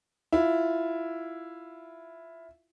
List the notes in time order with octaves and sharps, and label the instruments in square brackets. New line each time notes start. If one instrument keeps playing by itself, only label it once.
[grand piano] E4 F4